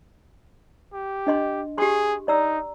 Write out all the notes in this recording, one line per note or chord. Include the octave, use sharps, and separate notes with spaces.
G4
D4 D#5 C6
G4 G#4 C6
D#4 D5 A#5 E6